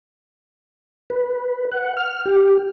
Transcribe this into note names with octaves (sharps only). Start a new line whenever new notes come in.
B4
F#5
F6
G4